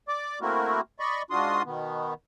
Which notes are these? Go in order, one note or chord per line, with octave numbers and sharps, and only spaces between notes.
D5 D6
A3 A#3 C4 E4 F#4 A#4
D5 D#5 B5 C#6
G#2 D4 F4 F#4 C6 D#6
B2 D#3 B3